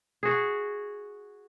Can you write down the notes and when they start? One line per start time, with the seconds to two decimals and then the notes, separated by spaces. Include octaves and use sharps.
0.23 F#4 G#4